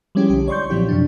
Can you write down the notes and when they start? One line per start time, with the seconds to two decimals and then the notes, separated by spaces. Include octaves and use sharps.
0.15 F3 G3 G#3 C#4 E4 G4
0.30 B1 D3 G4
0.48 C#5 D5 C6 C#6 G6
0.70 A#2 F3 F#3 C4 E4 G4
0.89 F#2 C3 D4